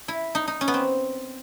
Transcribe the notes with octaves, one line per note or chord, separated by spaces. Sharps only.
E4
D#4
D#4
C#4
B3
C4